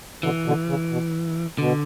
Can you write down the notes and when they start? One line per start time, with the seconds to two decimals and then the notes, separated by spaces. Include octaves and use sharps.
0.23 B2 D3 E3
0.45 B2 D3
0.68 C#3
0.91 B2
1.58 B2 D3